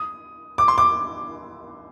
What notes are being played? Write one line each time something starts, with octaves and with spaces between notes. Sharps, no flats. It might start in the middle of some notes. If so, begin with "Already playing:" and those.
Already playing: D#6
D6
C6
D6